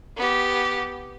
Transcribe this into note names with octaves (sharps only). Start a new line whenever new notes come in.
B3 G4